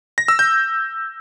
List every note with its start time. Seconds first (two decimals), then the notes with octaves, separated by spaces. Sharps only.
0.18 A#6
0.28 E6
0.39 G6